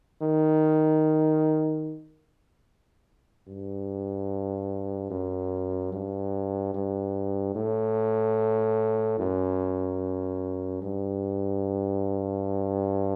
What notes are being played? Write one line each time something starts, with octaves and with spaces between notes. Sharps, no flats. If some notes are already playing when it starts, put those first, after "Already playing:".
D#3
G2
F#2
G2
G2
A2
F#2
G2